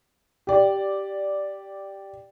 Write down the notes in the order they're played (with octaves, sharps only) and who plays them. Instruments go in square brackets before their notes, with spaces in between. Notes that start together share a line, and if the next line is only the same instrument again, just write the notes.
[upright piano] G4 D5